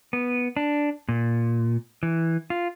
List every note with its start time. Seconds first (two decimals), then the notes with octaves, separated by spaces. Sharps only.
0.13 B3
0.57 D4
1.09 A#2
2.03 E3
2.50 F4